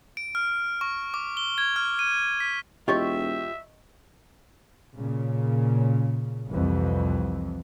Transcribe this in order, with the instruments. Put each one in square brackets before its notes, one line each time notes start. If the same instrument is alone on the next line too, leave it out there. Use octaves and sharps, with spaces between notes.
[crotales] D7
F6
C#6
D6
G7
G#6
F6
D#7
B6
[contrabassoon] E1 [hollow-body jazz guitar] F4 G4 C#5 [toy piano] D#5 C#6 [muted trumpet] E5
[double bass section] A#2 C#3
C2 F2 E3